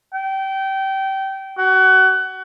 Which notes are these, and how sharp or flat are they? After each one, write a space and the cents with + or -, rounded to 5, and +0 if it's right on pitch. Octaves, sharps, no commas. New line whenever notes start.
G5 -25
F#4 +25